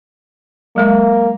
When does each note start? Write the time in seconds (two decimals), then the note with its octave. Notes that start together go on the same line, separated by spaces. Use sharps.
0.76 F#3 G#3 A#3 E5